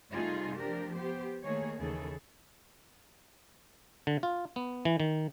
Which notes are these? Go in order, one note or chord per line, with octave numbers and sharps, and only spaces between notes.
C3 G3 A3 D#4 F4 G#4
F3 D4 G4 A#4
B3 G4 C5
D#3 A3 A#3 G#4 C#5
D#2 C#3 E3 G#4 A4
D3
F4
B3
E3
D#3